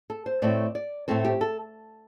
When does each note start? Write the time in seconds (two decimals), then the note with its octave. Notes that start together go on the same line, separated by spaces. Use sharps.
0.10 A4
0.26 C5
0.42 A2 A3 C4 D5
0.75 D5
1.08 A2 A3 C4 C5
1.25 G4
1.41 A4